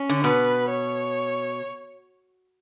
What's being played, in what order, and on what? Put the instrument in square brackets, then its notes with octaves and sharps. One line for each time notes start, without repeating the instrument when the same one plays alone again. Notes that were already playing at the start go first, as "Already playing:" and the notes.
Already playing: [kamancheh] C#4
[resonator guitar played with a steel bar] D3
[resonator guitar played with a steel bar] B2 [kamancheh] B4
[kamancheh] C#5